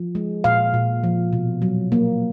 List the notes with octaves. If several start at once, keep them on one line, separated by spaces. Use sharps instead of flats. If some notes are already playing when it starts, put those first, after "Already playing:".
Already playing: F3
G#3
A#2 F5
A#2
F3
B2
F#3
A#3